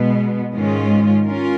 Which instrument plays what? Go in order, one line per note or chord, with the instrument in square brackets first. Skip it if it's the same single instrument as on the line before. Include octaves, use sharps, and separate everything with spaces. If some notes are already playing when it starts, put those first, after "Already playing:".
Already playing: [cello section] B2 G#3 B3
G#2 D#3 G#3 C#4 F4
C#4 F4 A#4